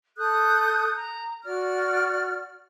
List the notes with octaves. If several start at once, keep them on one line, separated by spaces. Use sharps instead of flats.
A4 D#6 F#6 G6
A#5
F#4 D5 F6